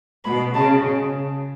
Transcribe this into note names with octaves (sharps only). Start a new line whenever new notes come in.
B2 B5
C#3 A5